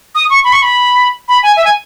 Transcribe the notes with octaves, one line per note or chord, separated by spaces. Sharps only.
D#6
C#6
B5
C#6
B5
B5
G#5
E5
G#5